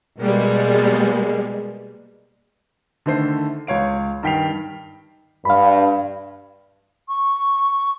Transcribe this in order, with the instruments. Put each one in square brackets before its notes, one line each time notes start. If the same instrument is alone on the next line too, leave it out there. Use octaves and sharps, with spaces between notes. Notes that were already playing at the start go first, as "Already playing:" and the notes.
[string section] B2 G3 G#3 A#3
[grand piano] D3 D#3 A3 C5 C7
C#2 C#5 F5 D7
G2 D#3 G5 B6 C7 F7
[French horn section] G2 [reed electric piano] F5 B5
[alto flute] C#6